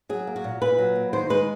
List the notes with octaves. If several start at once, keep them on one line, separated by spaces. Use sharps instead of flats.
F#3 G#4
A#3
F#4
A#2
A#2 B4
F#3
A#3
D#3 C5
G#3 B4